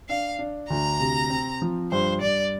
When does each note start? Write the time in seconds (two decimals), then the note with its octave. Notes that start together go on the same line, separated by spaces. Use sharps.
0.09 D4 F5
0.39 D4
0.70 D2 A#5
1.00 C3
1.30 C4
1.62 F3
1.91 G2 C5
2.21 G2 D5